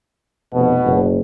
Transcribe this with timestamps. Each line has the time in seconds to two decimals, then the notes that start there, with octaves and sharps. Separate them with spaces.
0.54 F1 B2
0.86 F#1